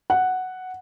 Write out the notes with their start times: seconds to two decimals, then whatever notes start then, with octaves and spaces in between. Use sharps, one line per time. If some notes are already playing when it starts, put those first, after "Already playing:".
0.10 F#5